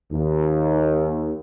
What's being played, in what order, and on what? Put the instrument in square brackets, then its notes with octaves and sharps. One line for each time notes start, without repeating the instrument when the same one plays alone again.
[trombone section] D#2